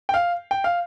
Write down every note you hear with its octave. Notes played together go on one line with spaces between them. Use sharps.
G5
F5
G5
F5